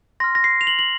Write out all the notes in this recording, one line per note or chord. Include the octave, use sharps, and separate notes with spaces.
C6 F6 A#6
A#6
C7
F7
F#7
F#7